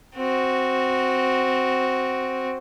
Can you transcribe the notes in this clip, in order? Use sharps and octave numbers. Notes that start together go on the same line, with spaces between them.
C4 F#4